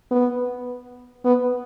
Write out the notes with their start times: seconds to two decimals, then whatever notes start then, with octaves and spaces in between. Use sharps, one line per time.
0.11 B3
1.25 B3